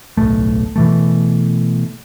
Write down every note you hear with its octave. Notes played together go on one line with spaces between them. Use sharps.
D1 B1 A3
B2 E3 A3